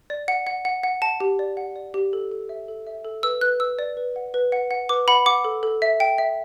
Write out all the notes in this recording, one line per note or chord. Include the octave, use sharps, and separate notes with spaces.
D5
F#5
F#5
F#5
F#5
F#5 A5
G4
D5
F#5
D5
G4
A4
A4
E5
A4
E5
A4
B4 E6
B4 F#6
B4 E6
D5
B4
F#5
B4
F#5
F#5
B4 D6
F#5 B5
F#5 D6
A4
A4
E5
G5
E5